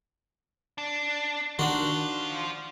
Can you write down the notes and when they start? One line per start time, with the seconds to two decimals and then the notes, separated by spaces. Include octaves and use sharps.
0.78 D4
1.59 D#3 D4 F4 F#4 C5